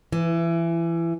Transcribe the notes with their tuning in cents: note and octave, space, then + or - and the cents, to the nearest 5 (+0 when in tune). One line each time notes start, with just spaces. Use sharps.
E3 +25